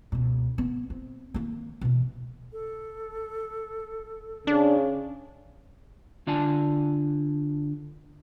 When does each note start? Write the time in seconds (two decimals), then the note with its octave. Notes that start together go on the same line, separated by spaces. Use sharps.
0.12 C#2 B2
0.58 B3
0.90 C4
1.34 D#3 A#3
1.81 B2 E3
2.53 A4
4.47 C#3 D4
6.27 D3 F4 D5 G#5 A5